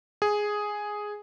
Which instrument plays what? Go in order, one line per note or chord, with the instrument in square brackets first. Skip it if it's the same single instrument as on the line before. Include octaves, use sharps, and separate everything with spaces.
[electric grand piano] G#4